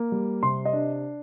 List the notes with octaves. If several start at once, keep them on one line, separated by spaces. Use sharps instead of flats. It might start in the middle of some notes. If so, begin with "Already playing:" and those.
Already playing: A#3
G3
C3 C6
D#5
D4